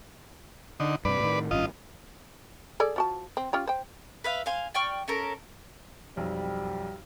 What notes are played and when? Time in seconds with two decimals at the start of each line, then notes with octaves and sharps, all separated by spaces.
0.80 D3 D#4
1.05 G2 C3 B4 D5
1.20 A2 D#3
1.51 G#1 G2 C#4 F4 D#5
2.80 G#4 A4 D5
2.96 F3 F#4 A5
3.37 C4
3.53 C#4 F4 G4
3.67 C5 G5
4.24 B4 E5 F5
4.46 C5 F5 G#5
4.74 D5 G5 C#6 F6
5.08 C#4 A4 A#4
6.17 B1 F2 G3